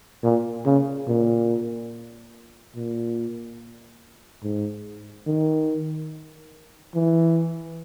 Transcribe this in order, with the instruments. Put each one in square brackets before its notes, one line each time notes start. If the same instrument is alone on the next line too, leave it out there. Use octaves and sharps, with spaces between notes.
[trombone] A#2
C#3
A#2
A#2
G#2
D#3
E3